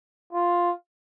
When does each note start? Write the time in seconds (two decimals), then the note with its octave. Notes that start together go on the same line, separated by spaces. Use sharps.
0.33 F4